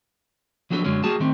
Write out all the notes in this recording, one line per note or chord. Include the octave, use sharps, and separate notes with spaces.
F3 F#3 B3 D4 A4
F#2 D3 F#3 G#3 C#4
G3 A#3 F#4 G#4 A5
D#3 A3 C4